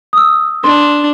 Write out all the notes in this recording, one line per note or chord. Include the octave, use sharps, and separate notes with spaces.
D#6 E6
D4 C6